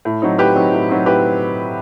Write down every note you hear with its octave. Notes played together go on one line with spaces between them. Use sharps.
A2
F#3 C4 D#4
A2 G4 B4
F#3 C4 D#4
A2
F#3 C4 D#4
A2 G4 B4